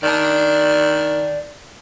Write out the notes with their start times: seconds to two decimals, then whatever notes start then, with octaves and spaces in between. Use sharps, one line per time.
0.03 D#3 D5 A5